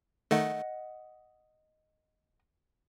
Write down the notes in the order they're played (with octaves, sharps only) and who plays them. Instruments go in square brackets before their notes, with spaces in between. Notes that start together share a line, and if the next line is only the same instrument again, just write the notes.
[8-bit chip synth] D#3 A3 [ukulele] D#5 F#5